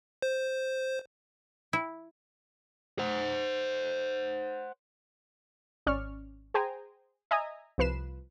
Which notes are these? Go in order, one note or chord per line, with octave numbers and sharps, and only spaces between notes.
C5
E4
C5 F#5
G#1 C#4 D5 C#6 F6
G#4 C5 G5 G#5 A#5
D#5 E5 G#5 A#5 D#6
C2 F3 B4 C7 E7